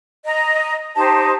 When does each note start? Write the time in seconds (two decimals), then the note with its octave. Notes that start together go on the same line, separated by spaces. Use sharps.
0.25 D#5 A#5
0.95 D#4 G4 C5 A5